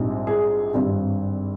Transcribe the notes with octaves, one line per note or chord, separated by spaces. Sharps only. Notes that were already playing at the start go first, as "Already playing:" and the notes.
Already playing: A#1 G#2 G3 C4
G#4
G#1 G2 G3 C4